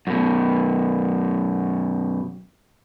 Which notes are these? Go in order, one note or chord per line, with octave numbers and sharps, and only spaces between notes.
F#2 B2